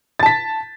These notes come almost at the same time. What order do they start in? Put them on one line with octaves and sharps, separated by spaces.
A6 A5 B6